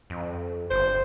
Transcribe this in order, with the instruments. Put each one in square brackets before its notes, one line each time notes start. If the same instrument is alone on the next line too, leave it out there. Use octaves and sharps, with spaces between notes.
[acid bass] F2
[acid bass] G1 [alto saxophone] C5